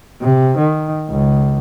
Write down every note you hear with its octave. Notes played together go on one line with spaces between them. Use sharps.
C3
D#3
C#2